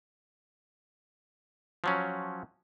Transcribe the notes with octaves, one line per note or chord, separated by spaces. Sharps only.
F3 F#3 C#4